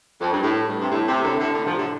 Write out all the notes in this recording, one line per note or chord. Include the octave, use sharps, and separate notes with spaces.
F2
G2
A2
G2
C3
A2
C3
A2 D3
A2 D3
A2 D3
C3 F3
A2 D3